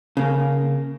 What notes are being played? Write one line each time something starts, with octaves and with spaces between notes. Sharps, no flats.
C#3 A#3